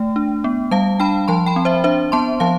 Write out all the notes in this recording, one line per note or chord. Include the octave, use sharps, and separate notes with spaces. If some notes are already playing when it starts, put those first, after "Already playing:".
Already playing: A3 G5
D4
B3
G3 F5 A5
D4 G5 B5
F3 A5 C6
G5 B5
C4
C5 E5
D4 C5 E5
B3 A5 C6
F3 F5 A5